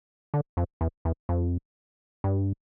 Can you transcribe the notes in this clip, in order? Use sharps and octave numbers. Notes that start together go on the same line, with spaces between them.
D3
F2
E2
E2
F2
G2